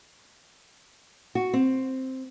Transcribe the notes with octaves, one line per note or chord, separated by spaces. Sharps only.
F#4
C4